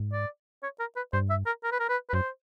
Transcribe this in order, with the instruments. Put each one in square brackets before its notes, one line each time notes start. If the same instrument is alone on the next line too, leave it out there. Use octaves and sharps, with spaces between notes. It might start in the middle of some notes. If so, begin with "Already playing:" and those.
Already playing: [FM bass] G#2
[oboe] D5
C#5
A#4
B4
[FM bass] G2 [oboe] C5
[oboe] E5
A#4
A#4
B4
A#4
B4
B4
[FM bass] F#2 [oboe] C5